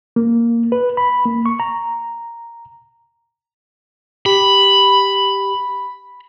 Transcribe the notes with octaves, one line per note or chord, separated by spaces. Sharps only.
A#3
B4
B5
A#3
C#6
A#5
G4 B5